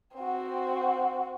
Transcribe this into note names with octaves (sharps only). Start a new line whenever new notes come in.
C4 F#4